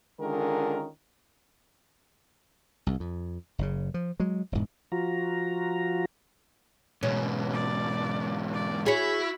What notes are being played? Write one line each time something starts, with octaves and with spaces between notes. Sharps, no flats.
D3 D#3 G#3 C#4 F4 A#4
C2
F2
F#1 C#3
F3
F#3 G#3
E1 G#2
F3 F4 F#4 A#5
E2 G#2 B2 C#4
D5
D5
E4 F#4 G#4 C#5 B5